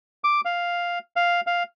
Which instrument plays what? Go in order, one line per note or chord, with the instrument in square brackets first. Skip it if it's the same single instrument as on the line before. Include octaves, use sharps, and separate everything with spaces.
[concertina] D6
F5
F5
F5